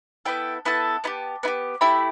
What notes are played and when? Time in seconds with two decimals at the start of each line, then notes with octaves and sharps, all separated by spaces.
0.25 B3 E4 A4 G5
0.65 B3 E4 A4 A5
1.04 B3 E4 G4
1.43 B3 E4
1.47 G4
1.81 A3 E4 G4 B5